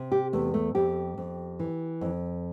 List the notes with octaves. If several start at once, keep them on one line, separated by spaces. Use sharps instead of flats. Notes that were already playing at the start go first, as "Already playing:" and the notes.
Already playing: C3
G4
E2 A3
A3
F2 G4
F2
E3
F2